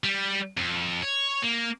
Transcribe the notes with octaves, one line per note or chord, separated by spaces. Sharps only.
G3
F2
C#5
A#3